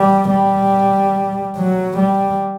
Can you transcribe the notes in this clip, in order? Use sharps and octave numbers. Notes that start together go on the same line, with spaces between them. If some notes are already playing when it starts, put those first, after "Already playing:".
Already playing: G3
G3
F#3
G3